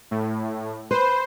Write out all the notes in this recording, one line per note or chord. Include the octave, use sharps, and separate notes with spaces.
A2
B4 C5